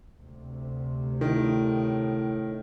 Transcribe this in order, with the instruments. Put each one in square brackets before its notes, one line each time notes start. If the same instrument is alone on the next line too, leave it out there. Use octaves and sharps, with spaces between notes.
[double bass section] D2 C3
[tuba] A2 [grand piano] D#3